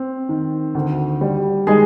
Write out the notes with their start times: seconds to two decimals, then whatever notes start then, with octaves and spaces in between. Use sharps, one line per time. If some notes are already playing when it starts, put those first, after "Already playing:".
Already playing: C4
0.29 D#3
0.75 D2
1.21 G3
1.67 D#3 G#3 G#4